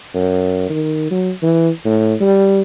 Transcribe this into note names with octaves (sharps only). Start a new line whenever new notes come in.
F#2
D#3
F#3
E3
A2
G3